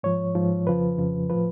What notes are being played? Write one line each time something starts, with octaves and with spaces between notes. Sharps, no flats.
G#2 F3 C#5
G#2 F3
F2 C#3 F3 B4
F2 C#3 F3
A2 F3 B4